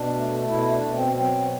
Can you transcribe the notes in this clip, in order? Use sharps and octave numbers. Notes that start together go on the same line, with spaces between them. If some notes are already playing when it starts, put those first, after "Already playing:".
Already playing: B2 D4
A3
B2 E4
D4
B2
C4
F#3 C4